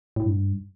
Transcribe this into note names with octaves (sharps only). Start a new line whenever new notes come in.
A2
G2